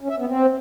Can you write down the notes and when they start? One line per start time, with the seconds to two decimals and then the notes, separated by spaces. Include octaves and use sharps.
0.01 C#4
0.10 E5
0.18 B3
0.27 C4